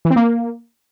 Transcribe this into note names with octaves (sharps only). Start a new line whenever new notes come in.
E3
C4
A#3